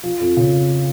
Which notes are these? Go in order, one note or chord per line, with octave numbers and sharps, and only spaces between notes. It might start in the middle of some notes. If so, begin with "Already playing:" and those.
F3
F2
C#3